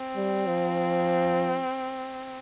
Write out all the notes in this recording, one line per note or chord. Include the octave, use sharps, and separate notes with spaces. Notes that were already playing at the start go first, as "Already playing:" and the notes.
Already playing: C4
G3
F3